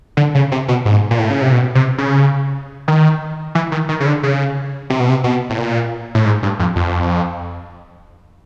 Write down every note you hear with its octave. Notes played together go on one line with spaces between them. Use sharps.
D3
C#3
C3
B2
G#2
A#2
A2
C#3
C3
B2
C3
C#3
D#3
E3
D#3
D#3
C#3
D3
C#3
C3
B2
C3
B2
A2
A#2
A2
G#2
G2
F2
F2